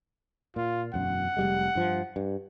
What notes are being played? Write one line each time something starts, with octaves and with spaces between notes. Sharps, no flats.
A#2 F4
E1 F#2 F#5
F1 G3 G#3
G2 F3
G2